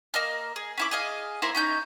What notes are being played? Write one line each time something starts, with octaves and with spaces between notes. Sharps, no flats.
A#3 D#5 F6
G#4
C#4 E4 D6
G#4 D#5 F5
A#3 E4 C5
C#4 D#4 G6